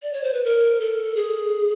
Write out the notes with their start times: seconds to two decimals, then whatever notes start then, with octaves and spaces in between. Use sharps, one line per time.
0.02 D5
0.13 C#5
0.23 C5
0.34 B4
0.44 A#4
0.80 A4
1.16 G#4